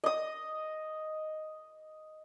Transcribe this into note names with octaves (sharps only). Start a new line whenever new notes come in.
D#5 D#6